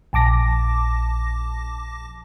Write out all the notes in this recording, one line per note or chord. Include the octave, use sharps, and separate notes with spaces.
A#1 A5 D6 A#6